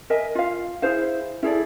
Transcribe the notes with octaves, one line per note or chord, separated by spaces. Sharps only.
A#4 D#5 E5 G#5
F4 F5
E4 G#4 C5 F5
E4 G#4 A4 D5